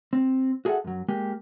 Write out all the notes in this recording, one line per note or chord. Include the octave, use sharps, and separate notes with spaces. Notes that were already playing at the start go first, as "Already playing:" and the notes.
C4
F#4 G#4 A4 C#5 E5 F#5
F#2 F#3
G#3 A#3 G4